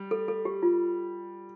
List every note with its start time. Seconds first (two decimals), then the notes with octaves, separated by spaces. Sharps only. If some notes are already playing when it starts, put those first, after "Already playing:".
Already playing: G3
0.11 A4
0.28 A4
0.45 G4
0.63 F4